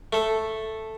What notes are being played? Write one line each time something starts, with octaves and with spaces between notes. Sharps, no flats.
A3 A4